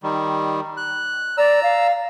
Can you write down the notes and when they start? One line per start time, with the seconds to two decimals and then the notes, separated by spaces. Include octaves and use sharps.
0.03 D#3 G3
0.77 F#6
1.38 D5 A#5 E6
1.63 F5